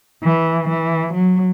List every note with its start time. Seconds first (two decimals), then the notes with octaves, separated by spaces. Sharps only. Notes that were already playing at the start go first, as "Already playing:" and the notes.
0.24 E3
0.69 E3
1.13 F#3